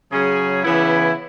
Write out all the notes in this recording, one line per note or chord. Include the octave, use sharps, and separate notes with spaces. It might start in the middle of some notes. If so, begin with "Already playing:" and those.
C#3 F#3 C#4 G#4
C#3 E3 B3 E4